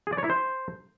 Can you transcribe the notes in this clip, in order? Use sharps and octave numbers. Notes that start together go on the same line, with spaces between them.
G#4
D5
C#5
E4
C5